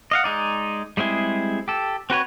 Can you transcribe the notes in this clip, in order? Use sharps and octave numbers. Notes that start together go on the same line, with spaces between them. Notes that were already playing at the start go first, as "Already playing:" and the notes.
D#5 F5 F#5
G#3 D#4 D5
G3 G#3 C4 E4 G#4
G4 A4
C4 F#4 B4 C#5